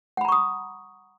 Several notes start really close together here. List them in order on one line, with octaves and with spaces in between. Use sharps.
F#5 B5 A#5 C#6 D#6